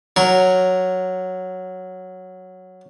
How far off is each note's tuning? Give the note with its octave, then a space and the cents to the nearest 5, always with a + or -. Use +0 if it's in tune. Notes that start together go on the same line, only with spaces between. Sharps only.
F#3 +0 A#4 +0 C#6 +0